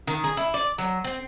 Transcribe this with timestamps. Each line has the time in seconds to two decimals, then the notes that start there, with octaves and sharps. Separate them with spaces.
0.07 D#3
0.24 G#4
0.37 E4
0.54 D5
0.78 F#3
1.04 C4